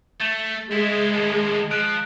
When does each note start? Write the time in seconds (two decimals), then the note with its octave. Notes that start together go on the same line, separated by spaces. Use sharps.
0.20 A3 A6
0.72 G#3 E4 C5
1.13 D#2 A2
1.71 F3 F#6 D7